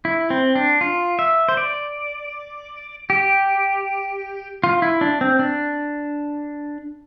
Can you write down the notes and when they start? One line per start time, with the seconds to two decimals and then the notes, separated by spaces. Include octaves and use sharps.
0.05 E4
0.30 C4
0.55 D4
0.81 F4
1.19 E5
1.49 C5
1.57 D5
3.10 G4
4.64 F4
4.82 E4
5.01 D4
5.21 C4
5.39 D4